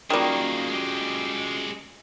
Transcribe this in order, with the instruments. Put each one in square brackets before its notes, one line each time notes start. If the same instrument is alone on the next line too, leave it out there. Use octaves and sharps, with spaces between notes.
[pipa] D#3 G3 [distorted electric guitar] A#3 G#4 [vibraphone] C#4 F4 F#4
[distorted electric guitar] G#3 G4